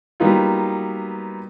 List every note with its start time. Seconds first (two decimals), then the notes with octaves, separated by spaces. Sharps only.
0.20 F#3 G3 A#3 B3 D#4 F4